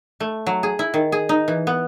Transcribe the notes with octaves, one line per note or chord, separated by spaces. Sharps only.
A3
F#3
G#4
E4
D#3
G#4
D#4
E3
B3